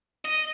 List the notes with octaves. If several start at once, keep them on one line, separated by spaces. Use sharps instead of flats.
D#5